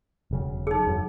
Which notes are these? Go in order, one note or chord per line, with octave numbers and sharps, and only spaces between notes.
E1 C#3 F#3
D#4 G#4
E2 G2 F#3